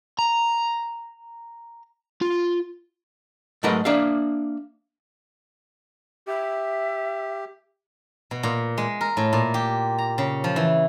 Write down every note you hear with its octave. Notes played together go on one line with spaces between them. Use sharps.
A#5
F4
G#2 F#3 A3 A#4 B4 D#5
A#3 D4 E5 F5
G4 E5
B2
A#2
G#3
A#4
A2
A#2
G4
A#5
C#3
F3
E3